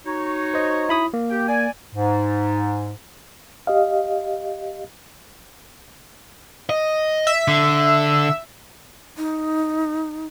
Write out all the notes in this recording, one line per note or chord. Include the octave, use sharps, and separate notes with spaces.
D#4 F#4 C#5
C5 D#5
E4 B5 D#6
A#3
G4 G5
D5 G#5
G#2
G4 D#5 F5
D#5
E5
D3
D#4